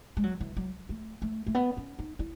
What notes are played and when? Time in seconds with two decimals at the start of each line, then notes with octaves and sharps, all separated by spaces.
0.17 G#3
0.23 F#3
0.41 E3
0.57 F#3
0.89 A3
1.22 A3
1.47 A3
1.55 B3
1.77 C#4
1.99 D#4
2.19 E4